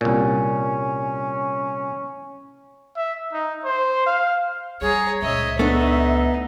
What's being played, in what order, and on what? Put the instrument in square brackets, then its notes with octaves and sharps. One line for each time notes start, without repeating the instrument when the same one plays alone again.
[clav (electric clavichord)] C2 A#2 [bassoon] C#4
[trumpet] E5
D#4
C5
F5
[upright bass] G3 [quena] G#4 [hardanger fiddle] C#5 A#5
[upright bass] C#2 A#2 [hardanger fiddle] C#5 D#5 [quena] E5
[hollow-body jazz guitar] A3 B3 D4 [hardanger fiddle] D#4